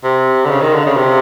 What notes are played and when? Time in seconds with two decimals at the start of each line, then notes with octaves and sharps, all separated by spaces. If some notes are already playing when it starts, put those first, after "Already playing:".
0.04 C3
0.45 D3
0.50 C#3
0.61 D#3
0.74 D3
0.86 C#3
0.97 C3